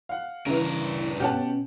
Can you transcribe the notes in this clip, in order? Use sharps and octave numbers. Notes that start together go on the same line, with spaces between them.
F5 F#5
G2 C#3 E3 A#4
B2 C#4 G4 F#5 A5